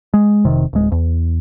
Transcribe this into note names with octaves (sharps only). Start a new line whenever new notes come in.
G#3
F1 C3 D#3
D1 G#3
E2